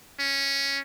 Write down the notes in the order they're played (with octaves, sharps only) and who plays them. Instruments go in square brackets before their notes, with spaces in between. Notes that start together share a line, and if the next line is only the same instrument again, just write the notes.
[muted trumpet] C#4